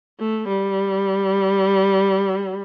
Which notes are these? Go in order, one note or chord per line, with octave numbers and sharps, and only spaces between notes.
A3
G3